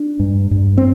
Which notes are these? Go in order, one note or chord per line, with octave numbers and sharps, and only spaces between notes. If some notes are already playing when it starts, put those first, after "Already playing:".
Already playing: D4
G2
G2
C4